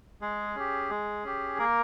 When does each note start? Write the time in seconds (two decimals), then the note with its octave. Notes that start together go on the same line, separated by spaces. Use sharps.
0.21 G#3 G#4
0.55 C#4 G4
0.90 G#3
1.24 C#4 G4
1.59 A#3 A#4